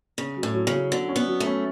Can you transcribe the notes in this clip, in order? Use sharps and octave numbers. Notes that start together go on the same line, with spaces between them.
C#3 C#4
F#3
A2
F#3
C#3
F#3
D3 F#3
C#4
B3
F#3
A3
C#4